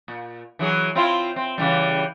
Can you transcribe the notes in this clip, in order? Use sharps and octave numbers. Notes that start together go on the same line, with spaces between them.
A#2
E3 F#3 G#4
C4 E4 F4
C4
C#3 E3 G3